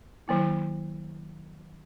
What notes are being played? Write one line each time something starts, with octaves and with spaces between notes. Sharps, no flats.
D#3 F#3 A#3 E4